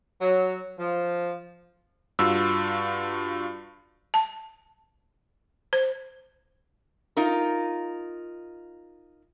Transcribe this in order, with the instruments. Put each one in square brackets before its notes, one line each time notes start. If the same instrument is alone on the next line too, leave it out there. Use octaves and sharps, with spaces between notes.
[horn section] F#3
F3
[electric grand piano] G2 F4 F#4 E6
[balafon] A5
C5
[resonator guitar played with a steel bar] D#4 F4 A#4